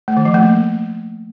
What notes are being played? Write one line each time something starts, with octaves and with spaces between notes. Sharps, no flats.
A3
D#3
F3
A3
A#3